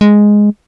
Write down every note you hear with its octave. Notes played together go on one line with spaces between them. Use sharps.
G#3